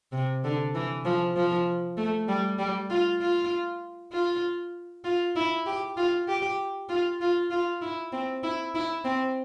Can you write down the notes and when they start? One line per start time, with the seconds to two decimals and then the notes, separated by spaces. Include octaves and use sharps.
0.12 C3
0.44 D3
0.74 E3
1.05 F3
1.36 F3
1.97 A3
2.28 G3
2.59 G3
2.90 F4
3.21 F4
4.12 F4
5.04 F4
5.36 E4
5.66 G4
5.97 F4
6.28 G4
6.89 F4
7.21 F4
7.51 F4
7.81 E4
8.12 C4
8.43 E4
8.75 E4
9.05 C4